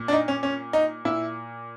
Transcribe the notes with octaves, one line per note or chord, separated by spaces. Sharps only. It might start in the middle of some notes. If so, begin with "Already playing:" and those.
Already playing: A#2
D4
D#4
C#4
C#4
D#4
A#2 E4